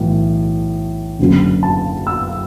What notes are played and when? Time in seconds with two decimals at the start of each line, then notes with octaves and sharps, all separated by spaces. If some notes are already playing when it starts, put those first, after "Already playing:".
Already playing: B1 A2 E3
1.19 F#1 F#2 D3
1.63 A5
2.07 E6